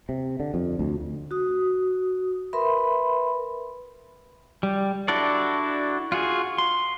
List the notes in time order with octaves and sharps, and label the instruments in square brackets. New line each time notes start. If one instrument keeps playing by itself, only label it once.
[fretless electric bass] C3
D3
F2
D2
[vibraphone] F#4 D#6
A#4 B4 E5 B5 C6
[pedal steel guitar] G3
D4 E4 F#4 A4 D5
F4 F#4 G#4
C6